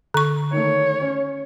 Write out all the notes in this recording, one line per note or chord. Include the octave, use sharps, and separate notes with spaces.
D3 C#6
D#3 A3 C#5
C#4